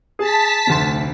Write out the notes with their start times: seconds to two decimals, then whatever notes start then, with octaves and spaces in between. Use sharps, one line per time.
0.19 G#4 A5 B6
0.67 F1 D2 C6